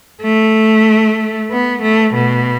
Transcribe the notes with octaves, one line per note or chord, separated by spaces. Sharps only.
A3
B3
A3
B2